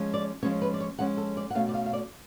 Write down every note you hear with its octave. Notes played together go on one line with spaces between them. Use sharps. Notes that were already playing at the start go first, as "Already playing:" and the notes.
Already playing: F3 G#3 C#4
D5
F3 G#3 C#4 C#5
B4
D5
C#5
F3 G#3 C#4 F#5
A4
D5
F#5
B2 A3 C#4 F5
D5
F5
F5
D5